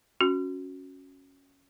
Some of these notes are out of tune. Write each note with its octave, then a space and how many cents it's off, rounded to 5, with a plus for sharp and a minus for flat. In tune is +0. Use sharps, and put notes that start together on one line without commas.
C#4 +0 F#4 -10